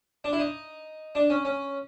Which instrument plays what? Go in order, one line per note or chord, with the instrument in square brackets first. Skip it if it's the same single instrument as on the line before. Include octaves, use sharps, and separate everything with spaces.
[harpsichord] D4
E4
D#4
D4
C#4
C#4